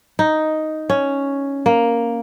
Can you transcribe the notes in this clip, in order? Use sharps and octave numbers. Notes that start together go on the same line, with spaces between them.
D#4
C#4
A#3